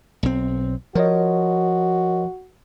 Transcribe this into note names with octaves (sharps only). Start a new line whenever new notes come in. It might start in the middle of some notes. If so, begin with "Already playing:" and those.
B1 C4
F3 F#4 A#4 C#5 D#5